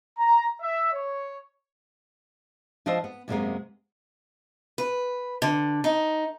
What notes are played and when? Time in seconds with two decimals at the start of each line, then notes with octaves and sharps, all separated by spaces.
0.19 A#5
0.62 E5
0.93 C#5
2.86 F3 D4 F4 C5 D#5 E5
3.04 B3
3.28 F#2 C3 G3 G#3 A#3 B3
4.78 B4
5.42 D3
5.84 D#4